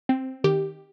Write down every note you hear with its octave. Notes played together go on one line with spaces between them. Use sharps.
C4
D#3 G4